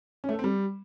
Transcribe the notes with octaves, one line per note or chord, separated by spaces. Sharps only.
C#4
A3
A4
C4
G3